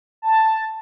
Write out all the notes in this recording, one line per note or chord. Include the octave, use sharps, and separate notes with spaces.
A5